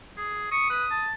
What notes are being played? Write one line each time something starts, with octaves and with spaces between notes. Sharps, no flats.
G#4
C#6 D#6
B4
A5